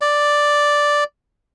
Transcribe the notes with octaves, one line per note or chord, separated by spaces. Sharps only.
D5